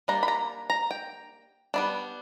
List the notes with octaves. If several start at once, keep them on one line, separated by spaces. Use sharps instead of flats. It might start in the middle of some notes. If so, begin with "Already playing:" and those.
G3 A#3 D4 A#5
B5
A#5
A#5
G5
G3 B3 D4